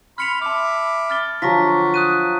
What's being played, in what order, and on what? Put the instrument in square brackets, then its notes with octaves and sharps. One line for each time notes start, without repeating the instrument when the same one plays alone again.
[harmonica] B5 C6 [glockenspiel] F6 C#7 F7
[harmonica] E5 B5 D6 [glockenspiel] A5 F6
[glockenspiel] F6 A6 G7
[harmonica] D3 [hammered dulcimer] F3 F#3 [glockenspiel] C#6 A#6 B6
[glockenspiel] D#6 F#6 D#7